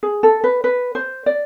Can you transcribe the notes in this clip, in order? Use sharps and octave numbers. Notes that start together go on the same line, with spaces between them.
G#4
A4
B4
B4
C5
D5